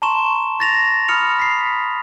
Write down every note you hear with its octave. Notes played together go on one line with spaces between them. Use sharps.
A5 A#5 C6 C#6 E7
C#6 A6 A#6 F7
B5 D#6 F6 C#7 F7
B6 C7